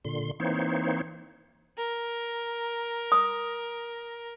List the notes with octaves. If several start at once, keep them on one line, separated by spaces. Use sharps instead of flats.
A#2 D3 C6
E3 A#3 C4 D#4 C5 C#5
A#4
D#6